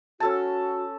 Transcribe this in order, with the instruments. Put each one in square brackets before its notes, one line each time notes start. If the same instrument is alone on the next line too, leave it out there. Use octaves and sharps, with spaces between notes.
[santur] C#4 A4 A5 [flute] F#4